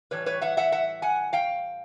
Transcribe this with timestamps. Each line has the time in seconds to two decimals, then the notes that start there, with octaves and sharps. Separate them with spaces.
0.11 A2 E3 G3 B4 C#5
0.26 B4 C#5
0.41 E5 F#5
0.57 E5 F#5
0.72 E5 F#5
1.02 F#5 G#5
1.33 F5 G5